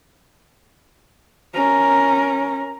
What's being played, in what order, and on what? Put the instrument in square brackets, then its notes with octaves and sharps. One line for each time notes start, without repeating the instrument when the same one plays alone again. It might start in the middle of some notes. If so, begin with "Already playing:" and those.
[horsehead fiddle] C#4 A#4